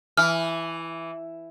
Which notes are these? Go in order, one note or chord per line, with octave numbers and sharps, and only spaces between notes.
E3 F6